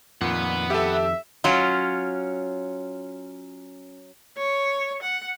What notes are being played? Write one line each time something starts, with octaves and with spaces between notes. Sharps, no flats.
F2 A#2 D#3 B4 F#5
G4 A4 E5
F#3 C#4 F4
C#5
F#5